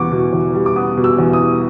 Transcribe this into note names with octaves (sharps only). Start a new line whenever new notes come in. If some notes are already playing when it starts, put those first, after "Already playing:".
Already playing: E2 B2 G3 B3 C#6 D6
B2
E2
G3
D6
B3 D#6
B2
E6
E2
D#6
G3